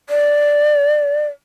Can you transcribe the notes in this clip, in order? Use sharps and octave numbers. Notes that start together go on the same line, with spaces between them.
D5